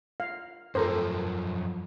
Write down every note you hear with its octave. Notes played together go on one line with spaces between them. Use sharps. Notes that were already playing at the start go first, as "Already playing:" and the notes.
F5
F#2 F3 A4 A#4 C5